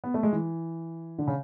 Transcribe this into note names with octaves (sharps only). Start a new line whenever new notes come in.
B3
A3
G#3
E3
D3
C#3